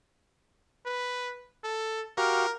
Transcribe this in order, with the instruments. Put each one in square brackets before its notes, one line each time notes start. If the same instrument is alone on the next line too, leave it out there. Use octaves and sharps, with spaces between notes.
[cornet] B4
A4
[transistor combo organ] F#4 G4 F5 [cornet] A#4